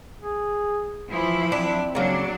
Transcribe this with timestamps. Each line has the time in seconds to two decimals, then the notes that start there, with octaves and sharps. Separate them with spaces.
0.21 G#4
1.08 E3 F3 E4
1.52 C4 D4
1.95 C#3 F#3 A#3 D4